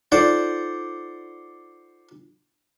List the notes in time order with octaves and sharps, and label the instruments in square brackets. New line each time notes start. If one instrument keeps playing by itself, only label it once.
[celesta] D#4 F4 A4 [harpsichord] C5 D5 F#5